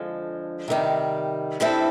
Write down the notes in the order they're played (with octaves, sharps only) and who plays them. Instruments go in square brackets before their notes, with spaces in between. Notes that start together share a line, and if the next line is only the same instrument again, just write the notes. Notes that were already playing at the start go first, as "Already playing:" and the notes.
Already playing: [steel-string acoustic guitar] F2 D3 F3 G#3
C3 D#3 G3
D3 G3 C4 E4 A4